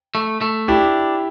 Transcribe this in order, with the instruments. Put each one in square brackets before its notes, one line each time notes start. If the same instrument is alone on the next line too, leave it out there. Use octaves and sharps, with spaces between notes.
[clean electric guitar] A3
A3
[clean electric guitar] D4 [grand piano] E4 G4